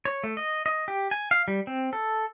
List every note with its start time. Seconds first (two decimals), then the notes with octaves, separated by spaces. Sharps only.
0.05 C#5
0.24 A3
0.37 D#5
0.66 D#5
0.88 G4
1.11 G#5
1.31 F5
1.48 G3
1.67 C4
1.93 A4